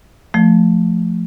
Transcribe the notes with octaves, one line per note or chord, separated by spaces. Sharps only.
F3 A3